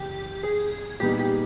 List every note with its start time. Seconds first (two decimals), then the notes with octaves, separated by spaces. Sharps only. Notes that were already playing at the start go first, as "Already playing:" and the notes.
Already playing: F#1 E2 G4
0.43 G#4
1.00 A#2 G3 B3 D#4 G4
1.19 G4